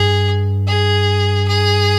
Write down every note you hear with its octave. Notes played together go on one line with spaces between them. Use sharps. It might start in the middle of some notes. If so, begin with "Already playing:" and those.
Already playing: G2 G#4
G#4
G#4